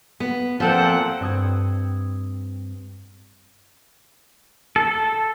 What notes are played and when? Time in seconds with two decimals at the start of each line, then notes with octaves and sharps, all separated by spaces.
0.20 B3
0.60 A#2 F3 C4 A4 F#5
1.20 G2 C4 D#6 G#6
4.76 A4